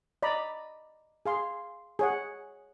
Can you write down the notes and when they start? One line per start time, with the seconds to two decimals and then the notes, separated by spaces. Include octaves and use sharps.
0.23 D5 D#5 A#5 B5
1.26 G#4 F5 C6
1.99 G#4 C#5 F#5